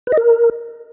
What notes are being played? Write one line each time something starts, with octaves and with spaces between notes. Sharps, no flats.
B4
D#5
A#4